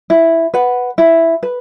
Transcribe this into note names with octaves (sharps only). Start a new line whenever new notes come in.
E4
B4 F#5
E4
B4